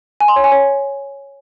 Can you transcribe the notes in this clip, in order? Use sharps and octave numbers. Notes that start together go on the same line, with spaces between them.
G#5
C6
C#5
G#5
C#5